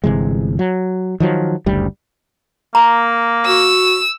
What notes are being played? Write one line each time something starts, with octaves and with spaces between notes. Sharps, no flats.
G1 C3 E3 G#3
F#3
D#3 F3 F#3
F#1 D2 G3
A#3 A#5
F#4 E6